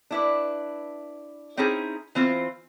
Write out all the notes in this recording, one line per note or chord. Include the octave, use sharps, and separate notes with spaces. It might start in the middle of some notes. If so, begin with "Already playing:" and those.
D4 E4 B4
C4 C#4 D#4 E4 G#4
E3 C4 F4 C5